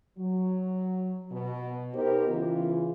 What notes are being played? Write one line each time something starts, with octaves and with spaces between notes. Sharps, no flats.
F#3
B2
B3 D#4 G4 A#4 C5
C#3 E3 F4